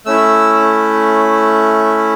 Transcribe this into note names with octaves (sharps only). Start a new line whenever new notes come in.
A3 C#4 E4 E6